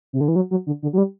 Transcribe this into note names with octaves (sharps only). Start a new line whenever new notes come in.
C3
D3
E3
F#3
F#3
D3
D3
F#3
G3